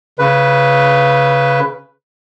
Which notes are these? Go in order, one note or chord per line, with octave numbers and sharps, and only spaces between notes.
C#3 B4